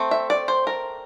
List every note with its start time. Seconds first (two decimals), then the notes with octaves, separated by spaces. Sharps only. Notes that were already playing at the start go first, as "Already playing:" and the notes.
Already playing: A3 C4
0.11 E5
0.30 D5
0.48 C5
0.67 A#4